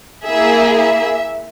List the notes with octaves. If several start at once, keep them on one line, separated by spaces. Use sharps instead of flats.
A#3 E4 G#4 E5
E5